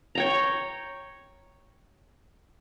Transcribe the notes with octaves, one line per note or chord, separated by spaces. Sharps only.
C#5 G5 A#5